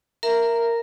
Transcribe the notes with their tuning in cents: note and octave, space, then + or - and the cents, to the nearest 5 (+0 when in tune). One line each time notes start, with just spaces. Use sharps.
A#4 +0 E5 +15 A#5 -10